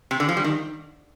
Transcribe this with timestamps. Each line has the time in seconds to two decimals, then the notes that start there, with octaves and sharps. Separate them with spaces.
0.11 C3
0.20 D3
0.29 F3
0.37 G3
0.44 D#3